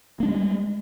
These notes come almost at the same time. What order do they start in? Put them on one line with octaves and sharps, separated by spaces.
A#3 D4 G#3 G3